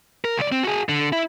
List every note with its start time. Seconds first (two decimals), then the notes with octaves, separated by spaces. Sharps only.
0.25 A#4
0.38 C#2 D5
0.52 C4
0.63 F#4 G#4
0.89 D3
1.12 E4